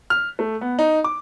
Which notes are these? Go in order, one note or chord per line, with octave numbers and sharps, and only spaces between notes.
F6
A3
B3
D#4
D6